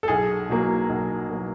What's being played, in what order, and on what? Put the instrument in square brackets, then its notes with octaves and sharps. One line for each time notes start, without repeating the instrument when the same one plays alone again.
[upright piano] A4
B1 G#4
B2 F#3 A#3
B1
B2 F#3 A#3